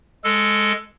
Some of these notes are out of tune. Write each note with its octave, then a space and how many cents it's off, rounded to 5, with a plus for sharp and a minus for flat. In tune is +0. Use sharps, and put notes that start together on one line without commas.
G#3 +0 A4 +0